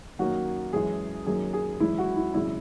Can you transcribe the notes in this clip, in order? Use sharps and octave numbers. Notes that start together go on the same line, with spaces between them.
F#2 D#3 F#3 A#3 F#4
F#2 E3 G#3 G#4
F#2 D#3 F#3 A#3 G#4
G#4
G#1 F#2 E3 G#3 E4
F#4
E4
G#1 F#2 C#3 G#3 E4